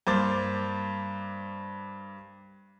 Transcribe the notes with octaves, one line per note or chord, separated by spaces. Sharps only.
G2 A#3 C5 D6 A6